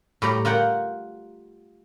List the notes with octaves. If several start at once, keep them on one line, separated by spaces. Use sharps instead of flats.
A2 G3 D5 A#5
F4 A#4 F#5 G5